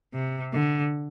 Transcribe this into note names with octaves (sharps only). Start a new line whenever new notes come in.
C3
D3